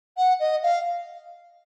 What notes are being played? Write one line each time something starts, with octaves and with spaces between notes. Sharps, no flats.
F#5
D#5
F5